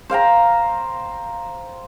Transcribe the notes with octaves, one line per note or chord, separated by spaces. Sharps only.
C5 F5 G5 A#5